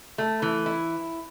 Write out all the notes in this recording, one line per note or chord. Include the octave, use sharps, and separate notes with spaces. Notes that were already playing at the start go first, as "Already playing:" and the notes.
A3
E3
E4